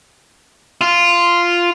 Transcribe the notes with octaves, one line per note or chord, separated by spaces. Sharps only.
F4